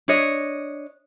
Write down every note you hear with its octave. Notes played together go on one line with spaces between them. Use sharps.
D4 C#5 D#5